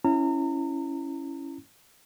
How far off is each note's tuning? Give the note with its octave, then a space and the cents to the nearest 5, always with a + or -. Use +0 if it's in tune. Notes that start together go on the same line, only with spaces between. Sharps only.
C#4 +0 E4 +0 A#5 -35